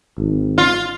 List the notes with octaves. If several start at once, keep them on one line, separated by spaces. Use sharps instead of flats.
G#1
F4